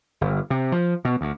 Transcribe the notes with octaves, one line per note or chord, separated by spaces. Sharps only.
G1
C3
F3
B2
D2